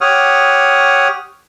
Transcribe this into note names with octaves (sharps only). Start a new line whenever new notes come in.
G4 C#5 F#5 D#6 F6